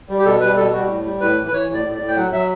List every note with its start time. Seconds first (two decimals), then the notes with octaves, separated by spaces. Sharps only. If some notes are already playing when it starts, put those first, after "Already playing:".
0.09 G3
0.19 G4
0.25 B2 A4
0.40 G3 B4
0.57 B2 A4
0.73 G3 F#4
0.88 A2
1.04 G3
1.21 A2 B4
1.36 E3
1.47 B4
1.52 E3 C#5
1.69 A2
1.74 D5
1.85 A2
1.96 A2 D5
2.08 G5
2.16 F#3 F#5
2.32 F#3 E5